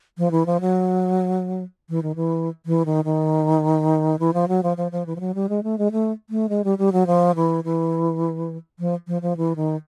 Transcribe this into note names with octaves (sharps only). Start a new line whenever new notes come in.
F3
E3
F3
F#3
E3
D#3
E3
E3
D#3
D#3
E3
F3
F#3
F3
F3
F3
E3
F3
F#3
G3
G#3
A3
G#3
A3
A3
G#3
G3
G3
F#3
F3
E3
E3
F3
F3
F3
E3
D#3